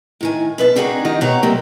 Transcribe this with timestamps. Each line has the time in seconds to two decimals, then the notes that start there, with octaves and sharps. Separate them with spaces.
0.21 A2 D#3 G#5
0.58 B2 B4 D5 A5
0.76 C4 D4 D#4 F#4 G#4 A#4
1.05 D#3 G4 D#5
1.21 B2 G4 C#5 F#5 A#5
1.43 C3 F#3 G3 A#3